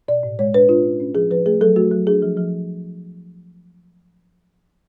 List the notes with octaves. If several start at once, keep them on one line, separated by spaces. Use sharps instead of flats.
B2 D5
A2
G#3 C#5
D4 B4
D4 F4
C#4
C#4
F3 G#4
F3 B4
A3 G#4
F#3 A4
A3 F#4
F#3
D4 G#4
F3
F3